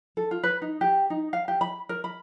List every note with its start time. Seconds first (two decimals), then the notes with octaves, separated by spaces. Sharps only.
0.17 A4
0.31 F4
0.43 B4
0.62 D#4
0.81 G4
1.10 D#4
1.33 F5
1.48 G4
1.61 B5
1.89 A#4
2.04 B5